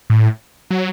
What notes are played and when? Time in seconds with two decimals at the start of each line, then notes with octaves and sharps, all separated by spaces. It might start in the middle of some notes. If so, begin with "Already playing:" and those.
0.10 A2
0.71 F#3